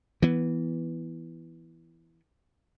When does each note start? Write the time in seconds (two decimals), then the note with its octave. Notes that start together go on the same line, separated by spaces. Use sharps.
0.22 E3 B3